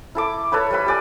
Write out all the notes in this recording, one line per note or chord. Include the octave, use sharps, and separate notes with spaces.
E4 A4 D6
A4 B4 C#5 B5
G3 B4 B5
G4 D5 G#5